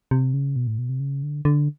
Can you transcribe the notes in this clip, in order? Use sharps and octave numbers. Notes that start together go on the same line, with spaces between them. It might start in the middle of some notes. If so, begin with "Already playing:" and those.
C3
C#3
B2
A2
B2
C3
C#3
D3
D3